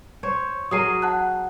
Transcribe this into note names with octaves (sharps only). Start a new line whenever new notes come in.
C5 C#5
F#3 G#4 A#4 D#6 C7 D#7
F#5 A5 F#6